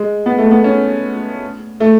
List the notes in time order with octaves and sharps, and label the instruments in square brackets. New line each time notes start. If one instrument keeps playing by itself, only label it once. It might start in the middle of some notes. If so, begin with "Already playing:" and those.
Already playing: [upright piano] G#3
B3
A3
B3
C#4
A3